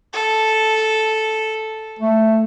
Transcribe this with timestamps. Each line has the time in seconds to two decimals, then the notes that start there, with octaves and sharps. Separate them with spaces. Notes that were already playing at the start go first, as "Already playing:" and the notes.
0.13 A4
1.99 A3